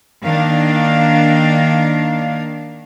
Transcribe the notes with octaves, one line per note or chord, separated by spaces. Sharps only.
D#3 A#3 D4 F5